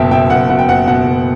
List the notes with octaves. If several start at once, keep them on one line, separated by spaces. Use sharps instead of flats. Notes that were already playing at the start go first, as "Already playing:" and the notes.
Already playing: F#1 B2 E5 G5 A5
B2 E5 G5
F#1 F#5
B2 F#5
G5
F#1 F#5
B2 F#5
F#1